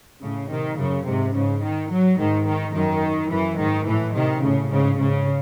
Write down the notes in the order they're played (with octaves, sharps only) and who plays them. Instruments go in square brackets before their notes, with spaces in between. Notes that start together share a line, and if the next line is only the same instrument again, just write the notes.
[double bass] A2 [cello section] C#3
[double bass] C3 [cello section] D#3
[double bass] F#2 [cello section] C#3
[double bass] G#2 [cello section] C3
[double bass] G#2 [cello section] C#3
[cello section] D#3
F#3
[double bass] G#2 [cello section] D#3
[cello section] D#3
[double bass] F#2 [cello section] D#3
[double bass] F#2 [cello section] E3
[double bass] G#2 [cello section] D#3
[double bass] A2 [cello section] E3
[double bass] C3 [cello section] D#3
[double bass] A2 [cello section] C#3
[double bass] G#2 [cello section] C#3
[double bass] G#2 [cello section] C#3